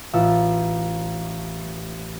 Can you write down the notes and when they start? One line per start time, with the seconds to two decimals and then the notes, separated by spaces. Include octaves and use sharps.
0.13 A1 F4 E6 A6 C#7